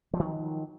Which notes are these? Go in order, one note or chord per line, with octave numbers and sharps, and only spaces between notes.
D#3 F3 F#3